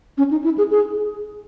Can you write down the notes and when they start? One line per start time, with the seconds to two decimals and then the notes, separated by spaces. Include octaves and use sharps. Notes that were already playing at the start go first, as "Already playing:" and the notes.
0.18 C#4
0.31 D#4
0.44 E4
0.58 G#4
0.71 G#4